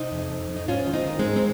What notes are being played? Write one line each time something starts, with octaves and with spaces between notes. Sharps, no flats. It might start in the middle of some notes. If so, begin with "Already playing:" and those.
Already playing: C3 C4 D#4
F2
F2
F2
D#4
G#2 C#4 F4
D#3
C4 D#4
D#3
G#3 C4
G#2
C4